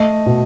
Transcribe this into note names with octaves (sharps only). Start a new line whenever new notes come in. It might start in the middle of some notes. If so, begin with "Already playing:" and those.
Already playing: A3 D#5
B2